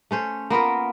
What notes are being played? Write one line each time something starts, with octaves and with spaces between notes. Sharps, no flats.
A3 C#4 C5
A#3 B3 F4 A#4